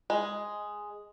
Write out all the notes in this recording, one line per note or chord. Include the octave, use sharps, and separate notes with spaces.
G#3